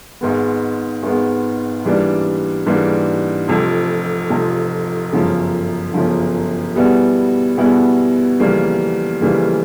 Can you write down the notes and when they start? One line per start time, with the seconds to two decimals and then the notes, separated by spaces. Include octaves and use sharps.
0.21 G#1 G#2 D#3 G#3 B3
1.03 G#1 G#2 D#3 G#3 B3
1.84 G#2 E3 G3 A#3 D4
2.66 G#2 E3 G3 A#3 D4
3.48 F1 F2 C3 F3
4.30 F1 F2 C3 F3
5.12 G1 F#2 C#3 F3
5.94 G1 F#2 C#3 F3
6.76 B2 G3 B3 E4 G#4
7.57 B2 G3 B3 E4 G#4
8.40 F2 C#3 E3 G3 A#3
9.21 F2 C#3 E3 G3 A#3